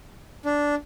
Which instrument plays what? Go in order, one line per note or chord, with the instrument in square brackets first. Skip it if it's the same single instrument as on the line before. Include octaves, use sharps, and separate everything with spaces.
[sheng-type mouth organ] D4